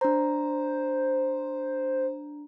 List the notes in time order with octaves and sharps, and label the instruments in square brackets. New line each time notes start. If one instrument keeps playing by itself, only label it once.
[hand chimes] D4 A#5 [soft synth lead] C5